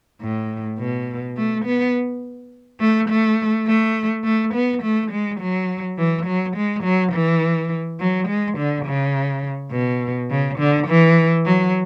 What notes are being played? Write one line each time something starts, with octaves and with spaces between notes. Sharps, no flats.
A2
B2
A3
B3
A3
A3
A3
A3
B3
A3
G#3
F#3
E3
F#3
G#3
F#3
E3
F#3
G#3
D3
C#3
B2
C#3
D3
E3
F#3